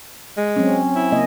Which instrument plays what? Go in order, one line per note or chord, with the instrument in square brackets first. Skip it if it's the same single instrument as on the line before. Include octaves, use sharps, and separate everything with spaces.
[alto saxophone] G#3
[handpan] F#3 C4 C#4
[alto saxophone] E4
[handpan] C#3 A#3 D#5